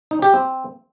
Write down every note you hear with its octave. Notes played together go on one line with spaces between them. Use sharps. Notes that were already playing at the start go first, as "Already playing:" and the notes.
D#4
G4
C4